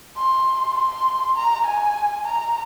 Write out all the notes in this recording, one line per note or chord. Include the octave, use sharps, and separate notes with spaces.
C6
C6
A#5
G#5
A#5